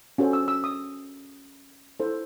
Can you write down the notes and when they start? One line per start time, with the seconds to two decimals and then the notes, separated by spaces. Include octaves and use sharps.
0.18 C#4 F#4 A4 C5
0.33 E6
0.48 E6
0.64 D#6
2.00 E4 A4 C5